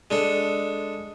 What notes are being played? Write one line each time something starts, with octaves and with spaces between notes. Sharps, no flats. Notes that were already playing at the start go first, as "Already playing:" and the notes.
G#3 D4 A4